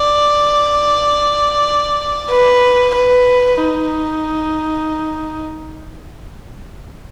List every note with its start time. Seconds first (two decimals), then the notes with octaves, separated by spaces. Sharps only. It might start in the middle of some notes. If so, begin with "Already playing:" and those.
Already playing: D5
2.30 B4
2.95 B4
3.57 D#4